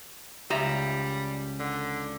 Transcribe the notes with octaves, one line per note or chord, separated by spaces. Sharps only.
C#2 G3 E5 A#5
D3